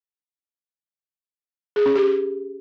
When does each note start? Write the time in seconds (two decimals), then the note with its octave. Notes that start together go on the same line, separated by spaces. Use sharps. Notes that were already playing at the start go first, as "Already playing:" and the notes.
1.76 G#4
1.86 C#4
1.96 G4